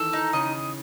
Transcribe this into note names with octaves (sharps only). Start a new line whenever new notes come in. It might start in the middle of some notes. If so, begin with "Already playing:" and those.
Already playing: D#3 E3 A4
E3 D#4
C#3 D#5